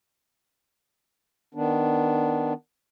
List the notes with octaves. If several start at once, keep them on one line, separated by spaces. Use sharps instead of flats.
D#3 B3 D4